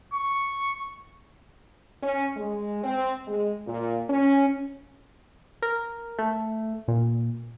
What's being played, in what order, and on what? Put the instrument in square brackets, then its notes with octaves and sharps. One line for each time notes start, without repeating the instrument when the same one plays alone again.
[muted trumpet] C#6
[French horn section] C#4
G#3
C4
G#3
A#2
C#4
[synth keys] A#4
A3
A#2